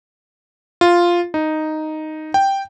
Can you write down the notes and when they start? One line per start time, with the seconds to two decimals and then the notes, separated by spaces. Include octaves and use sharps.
0.81 F4
1.34 D#4
2.34 G5